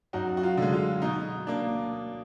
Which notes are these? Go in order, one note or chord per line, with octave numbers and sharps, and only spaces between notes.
F#2 D#4 F#4
F#4
F4
D3 G#3
F4
B2 D#4
A#3 D4